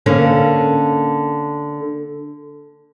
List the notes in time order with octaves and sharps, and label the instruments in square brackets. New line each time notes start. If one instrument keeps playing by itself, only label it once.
[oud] D3 A#3 C#4